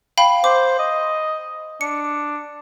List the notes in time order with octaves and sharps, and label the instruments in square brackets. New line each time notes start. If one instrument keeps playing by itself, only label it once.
[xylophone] F5 G5 B5
[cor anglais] C5 [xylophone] D6
[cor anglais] D#5
[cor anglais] D4 [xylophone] C#7